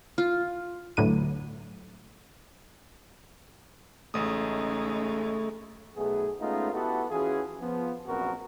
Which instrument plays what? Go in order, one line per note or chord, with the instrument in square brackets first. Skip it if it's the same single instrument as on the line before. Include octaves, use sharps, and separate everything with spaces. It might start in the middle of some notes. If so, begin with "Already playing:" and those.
[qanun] F4
[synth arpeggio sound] D2 A2 D3 F#3 B4 D#7
[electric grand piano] A1 D#6 [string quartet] C#3 G#3 D#4 [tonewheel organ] A3
[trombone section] B1 A3 B3 G#4
G#3 A3 B3 C#4 D#4 F4
B3 E4 F#4 G4 A4
E3 C#4 F4 F#4 G#4
F3 B3
A#1 F#2 B3 C4 F#4 A#4